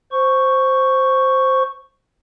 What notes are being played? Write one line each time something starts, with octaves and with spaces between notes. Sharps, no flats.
C5 C#6